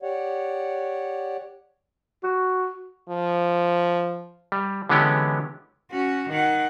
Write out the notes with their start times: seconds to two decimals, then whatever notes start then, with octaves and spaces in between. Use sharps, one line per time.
0.02 G4 C#5 D5 F#5
2.23 F#4
3.09 F3
4.52 G3
4.89 D3 E3 G#3 B3 C#4 G4
5.91 C#4 F#4
6.30 D#3 F#5